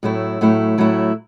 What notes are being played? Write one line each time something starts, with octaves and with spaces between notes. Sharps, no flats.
A2 F#3 A3 E4
A2 F#3 A3 E4
A2 F#3 A3 E4